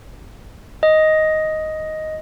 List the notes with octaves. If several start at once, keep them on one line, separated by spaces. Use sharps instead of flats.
D#5